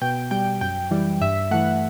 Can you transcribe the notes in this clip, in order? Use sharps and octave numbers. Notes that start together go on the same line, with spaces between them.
B2 G5
G3 G5
F#2 G5
E3 G3
G2 E5
E3 A3 F#5